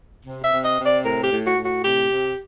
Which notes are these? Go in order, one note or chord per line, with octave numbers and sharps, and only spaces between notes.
C3
E5
C3
D#5
C3
D5
A2 A#4
G4
A2
F#4
A2
F#4
C3 G4
C3